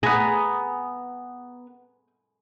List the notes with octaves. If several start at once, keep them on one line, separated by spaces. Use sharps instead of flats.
B3 G#4 G#5 A#5 B5 D#6